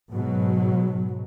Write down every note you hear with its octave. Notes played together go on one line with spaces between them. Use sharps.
G#2 B2 F#3